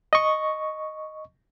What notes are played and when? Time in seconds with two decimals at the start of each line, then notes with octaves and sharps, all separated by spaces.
0.13 D#5 C#6